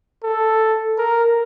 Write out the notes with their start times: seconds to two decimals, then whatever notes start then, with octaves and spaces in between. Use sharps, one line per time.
0.24 A4
0.98 A#4